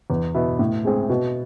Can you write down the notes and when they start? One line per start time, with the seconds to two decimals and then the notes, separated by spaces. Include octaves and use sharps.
0.10 E2
0.35 B2 B3 E4
0.59 A2
0.85 G#3 C4 G#4
1.10 B2